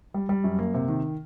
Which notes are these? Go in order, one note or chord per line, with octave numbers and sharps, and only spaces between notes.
G3
G3
F#2
A#3
C3
D#3